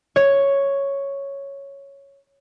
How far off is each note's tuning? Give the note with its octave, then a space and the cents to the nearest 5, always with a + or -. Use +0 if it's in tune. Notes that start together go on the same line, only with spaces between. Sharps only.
C#5 +0